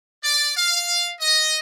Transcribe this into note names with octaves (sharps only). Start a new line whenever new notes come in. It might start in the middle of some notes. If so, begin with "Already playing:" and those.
D5
F5
D#5